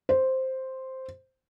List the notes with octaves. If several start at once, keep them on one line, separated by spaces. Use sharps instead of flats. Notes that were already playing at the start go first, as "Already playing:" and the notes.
C5